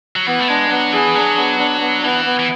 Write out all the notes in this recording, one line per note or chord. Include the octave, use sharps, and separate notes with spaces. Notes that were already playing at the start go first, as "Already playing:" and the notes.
F#3
E3 B3
A3
G#3 D4
F#3 B3
E3 G#4
F#3 D4
B3
D4
B3
E3 B3
B3
E3